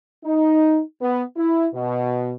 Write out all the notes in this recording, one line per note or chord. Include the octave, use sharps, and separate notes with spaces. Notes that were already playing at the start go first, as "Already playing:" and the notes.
D#4
B3
E4
B2